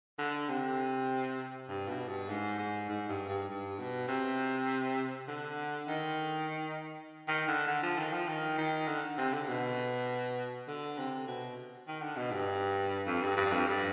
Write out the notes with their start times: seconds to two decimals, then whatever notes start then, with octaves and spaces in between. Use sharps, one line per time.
0.19 D3
0.49 C3
1.69 G2
1.88 B2
2.09 G2
2.29 G#2
2.59 G#2
2.89 G#2
3.09 G2
3.29 G2
3.49 G2
3.79 B2
4.08 C3
5.28 D3
5.89 D#3
7.28 D#3
7.48 D3
7.68 D3
7.83 F3
7.98 D#3
8.13 F3
8.28 D#3
8.58 D#3
8.88 D3
9.18 C3
9.33 D3
9.48 B2
10.68 D3
10.98 C3
11.28 B2
11.88 D#3
12.02 D3
12.17 B2
12.32 G2
13.07 F2
13.22 G2
13.37 G2
13.52 F2
13.68 G2